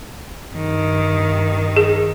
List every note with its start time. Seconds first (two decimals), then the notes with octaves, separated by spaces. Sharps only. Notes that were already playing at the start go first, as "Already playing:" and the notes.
0.53 G2 D#3
1.77 G#4